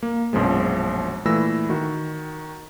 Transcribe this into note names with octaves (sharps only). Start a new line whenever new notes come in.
A#3
A#1 F#2 B2 F3 G#3
A#2 E3 A3 B5 E6 A#6
D#3 F#4